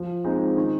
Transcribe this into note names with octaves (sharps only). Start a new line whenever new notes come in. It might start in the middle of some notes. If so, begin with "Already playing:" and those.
Already playing: F3
G#3 C4 D#4
D#3